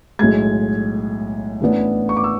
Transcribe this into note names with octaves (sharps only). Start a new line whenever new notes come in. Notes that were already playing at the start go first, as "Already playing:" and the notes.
B1 A2 G#3 G#6
A1 A2 E3 B3 D4
C#6
D6
E6